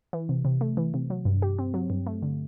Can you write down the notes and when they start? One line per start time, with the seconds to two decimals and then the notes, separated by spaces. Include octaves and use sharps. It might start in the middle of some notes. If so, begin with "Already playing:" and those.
0.13 E3
0.29 C3
0.45 C3
0.61 A3
0.77 E3
0.94 C3
1.10 F#3
1.25 G2
1.42 G4
1.59 C4
1.74 F#3
1.90 G2
2.07 A3
2.22 D3